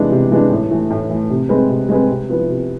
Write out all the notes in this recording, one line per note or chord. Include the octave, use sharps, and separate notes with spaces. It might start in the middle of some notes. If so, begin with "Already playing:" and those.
Already playing: C3 E3 G#3 B3 D4
C3
E3 G#3 B3 D4
A2
E3 A3
A2
E3 A3
C3
G#3 C4 G#4 B4
C3
G#3 C4 G#4 B4
C3
F3 B3 E4 B4
C3